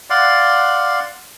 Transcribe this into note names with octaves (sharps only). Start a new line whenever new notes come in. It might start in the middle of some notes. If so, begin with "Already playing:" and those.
D5 F5 F#5 C6